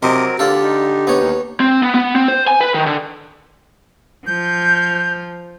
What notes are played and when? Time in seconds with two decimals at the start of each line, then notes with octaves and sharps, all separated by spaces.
0.03 C3 F#3 C4 A#4 D#5
0.39 D3 A#3 D4 F4 G4 A4
0.62 D#4
1.07 B3 C#5
1.21 D#2
1.60 C4
1.83 B3
1.95 B3
2.16 C4
2.28 C5
2.48 G#5
2.61 B4
2.74 D#3
2.86 D3
4.27 F3 G6